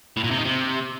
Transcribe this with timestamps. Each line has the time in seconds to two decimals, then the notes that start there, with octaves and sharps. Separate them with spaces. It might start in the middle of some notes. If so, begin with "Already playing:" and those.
0.17 A2
0.24 A#2
0.31 C3
0.38 D#3
0.45 C3